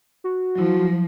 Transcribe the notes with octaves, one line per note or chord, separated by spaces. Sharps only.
F#4
F3 F#3 E4